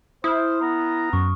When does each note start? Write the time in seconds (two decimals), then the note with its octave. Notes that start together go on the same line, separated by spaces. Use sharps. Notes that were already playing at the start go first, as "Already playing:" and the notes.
0.24 E4 C5 D#6 F6
0.61 B3 A#5
1.13 F#2 C#6